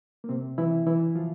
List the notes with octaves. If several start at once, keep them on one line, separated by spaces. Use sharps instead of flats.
A#3
C3 C4
E3 E4
E3 E4
F3 F4